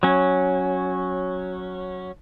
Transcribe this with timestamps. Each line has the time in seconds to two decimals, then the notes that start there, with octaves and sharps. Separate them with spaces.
0.03 F#3 C#4